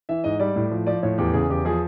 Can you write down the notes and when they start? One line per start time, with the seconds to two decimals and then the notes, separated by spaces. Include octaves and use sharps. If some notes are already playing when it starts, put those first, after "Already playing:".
0.09 E3 E5
0.24 G#2 D#5
0.39 G3 D5
0.56 A2
0.71 F3
0.87 F3 D5
1.03 A2 C#5
1.18 E2 G4
1.34 C#3 G#4
1.50 E2 G4
1.65 F3 G#4